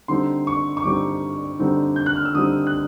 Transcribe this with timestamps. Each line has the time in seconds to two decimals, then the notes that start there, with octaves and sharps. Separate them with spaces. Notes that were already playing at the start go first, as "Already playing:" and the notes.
0.08 D3 G3 C4 D#4 C6
0.47 C#6
0.77 C#6
0.84 D3 G3 C4 D#4 D6
1.59 D3 G3 C4 D#4
1.96 G6
2.06 F#6
2.16 F6
2.25 E6
2.34 D3 G3 C4 D#4 D#6
2.67 F#6